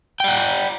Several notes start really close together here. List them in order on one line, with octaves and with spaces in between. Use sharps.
G5 D5 F#5